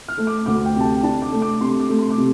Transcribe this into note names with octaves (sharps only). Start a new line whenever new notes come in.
F6
A3
D6
D2 D6
G5
C3 A5
G5
D4 A5
D6
A3
D6
C3 C6
D6
A3
C6
D6
C3